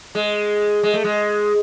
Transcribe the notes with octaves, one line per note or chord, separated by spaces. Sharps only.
G#3
G#3
A3
G#3